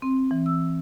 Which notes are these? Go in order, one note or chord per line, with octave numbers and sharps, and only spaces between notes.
C4
E3
E6